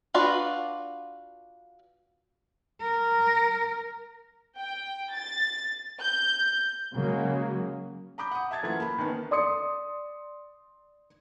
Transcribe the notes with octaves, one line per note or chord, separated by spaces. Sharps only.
D4 F4 F#4 B4 D5
A#4
G5
A6
G6
C#3 F#3 G#3 A#3
A#5 B5 D6 G6
F#5 D#6
E5 A5 G#6 A6
F#1 E3 A3 F4 F#5 G#6
A#3 A5 B5
D#3 A#3 B3 C#4 D#4
D5 C6 D#6 C#7